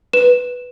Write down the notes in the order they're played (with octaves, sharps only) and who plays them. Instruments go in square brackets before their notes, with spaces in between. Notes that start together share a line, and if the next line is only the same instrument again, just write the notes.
[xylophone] B4 E7